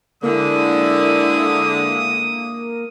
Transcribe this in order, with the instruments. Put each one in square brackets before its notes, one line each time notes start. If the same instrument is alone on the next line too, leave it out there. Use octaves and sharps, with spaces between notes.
[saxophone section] D3 [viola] G#3 E4 [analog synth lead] A#3 [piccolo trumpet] D#6